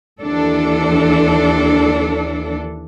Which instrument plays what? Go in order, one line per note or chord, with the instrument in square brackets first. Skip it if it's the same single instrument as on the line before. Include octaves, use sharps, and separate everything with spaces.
[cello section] D#2 E3 D4 A4